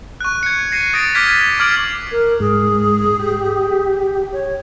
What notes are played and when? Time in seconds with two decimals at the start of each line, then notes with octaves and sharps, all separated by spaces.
0.21 C#6 F#6
0.43 G#6 C#7
0.72 A#6 C7 D#7
0.93 D#6 A6 A#6 C#7 D7
1.15 D6 F6 G#6 A#6 B6
1.59 D6 F6 G#6 C7 D7 F#7
2.11 A#4
2.40 G#2 G#4
3.19 G4
4.33 C#5